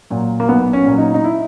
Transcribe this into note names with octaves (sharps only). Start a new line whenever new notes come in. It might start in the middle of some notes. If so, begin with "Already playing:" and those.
A#2 F#3
A#3
B1 B3
C#4
A#2 F#3
D#4
D#4
E4